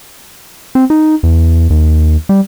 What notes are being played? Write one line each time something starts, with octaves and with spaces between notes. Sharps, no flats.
C4
D#4
E2
D#2
G3